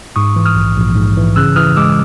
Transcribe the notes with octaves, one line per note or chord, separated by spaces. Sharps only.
G#2 C#6 D#6
E3
D#6 F6
A#1
A#1
G#2
E3
C#3 E6 F#6
E3 D#6 F6
G#3 D6 E6